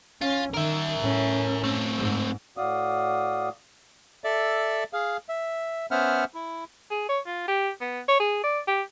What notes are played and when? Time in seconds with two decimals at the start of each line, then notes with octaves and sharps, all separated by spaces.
0.21 C#4 F4
0.54 D#3 A#4 E5
0.99 A2 C#4
1.64 A3 C4
1.98 G#2
2.57 A2 F#4 D5 F5 D#6
4.24 A4 D5 E5
4.93 G#4 F5
5.29 E5
5.91 B3 C#4 C5 E5 F#5 F6
6.34 E4
6.91 G#4
7.09 C#5
7.27 F4
7.48 G4
7.81 B3
8.08 C#5
8.20 G#4
8.44 D5
8.67 G4